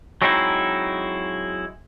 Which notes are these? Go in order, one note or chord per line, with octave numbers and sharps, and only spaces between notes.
F#3 G#3 C4 D#4 E4